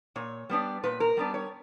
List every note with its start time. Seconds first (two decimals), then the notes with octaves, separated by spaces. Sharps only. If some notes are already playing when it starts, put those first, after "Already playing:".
0.16 A#2 C#5
0.49 G3 B3 D4
0.83 A#2 B4
1.00 A#4
1.17 G3 B3 D4
1.34 C#5